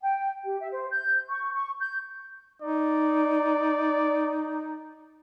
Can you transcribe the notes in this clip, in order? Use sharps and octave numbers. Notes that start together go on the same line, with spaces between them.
G5
G4
E5
C5
G6
C#6
C#6
G6
D#4 D5